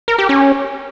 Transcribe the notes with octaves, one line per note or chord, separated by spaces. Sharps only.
A#4
G4
C#4